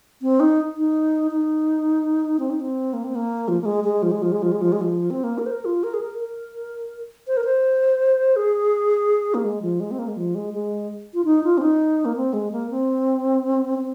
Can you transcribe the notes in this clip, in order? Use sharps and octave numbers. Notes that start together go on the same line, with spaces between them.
C4
D#4
D#4
D#4
C4
D#4
C4
A#3
C4
A#3
F3
A#3
G#3
G#3
F3
G#3
F3
G#3
F3
G#3
F3
G#3
F3
C4
A#3
A#4
C5
A#4
F4
A#4
G#4
A#4
A#4
C5
A#4
C5
G#4
A#3
G#3
F3
G#3
C4
A#3
G#3
F3
G#3
G#3
F4
D#4
F4
C4
D#4
A#3
C4
G#3
A#3
C4
C4